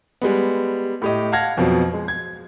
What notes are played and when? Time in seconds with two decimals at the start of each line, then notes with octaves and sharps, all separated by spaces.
0.22 G3 G#3 B3
1.02 A2 G4 D#5
1.32 F5 F#5 A5 F6 G#6 A#6
1.57 F2 B2 F3 F#3
1.93 G#3
2.08 G#6